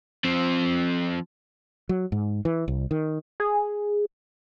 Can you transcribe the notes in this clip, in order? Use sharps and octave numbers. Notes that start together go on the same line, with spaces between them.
F3 C4
F#3
G#2
E3
C2
D#3
G#4